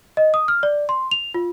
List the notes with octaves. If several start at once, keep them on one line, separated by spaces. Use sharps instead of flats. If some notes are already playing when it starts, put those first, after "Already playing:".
D#5
D#6
F6
D5
C6
F7
F4